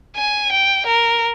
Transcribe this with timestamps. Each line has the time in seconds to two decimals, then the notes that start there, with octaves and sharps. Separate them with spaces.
0.16 G#5
0.52 G5
0.86 A#4